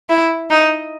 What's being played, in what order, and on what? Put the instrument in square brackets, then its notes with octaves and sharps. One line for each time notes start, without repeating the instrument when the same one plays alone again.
[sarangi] E4
D#4